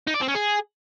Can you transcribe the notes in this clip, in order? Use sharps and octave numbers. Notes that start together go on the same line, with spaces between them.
D#4
D5
C4
C#4
G#4